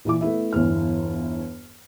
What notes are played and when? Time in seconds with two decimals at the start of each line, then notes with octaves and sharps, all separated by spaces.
0.05 A#2 E3 E4 D6
0.21 A3 B3 E4 E5
0.53 G1 E2 E3 F6